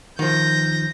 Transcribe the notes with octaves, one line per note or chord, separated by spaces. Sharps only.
D#3 F3 G6 A#6